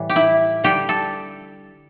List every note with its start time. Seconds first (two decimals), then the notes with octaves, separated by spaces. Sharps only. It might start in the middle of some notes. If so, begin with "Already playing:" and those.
Already playing: A2 E3 G3
0.09 G4
0.16 E4
0.64 D3 G3 G4
0.89 A4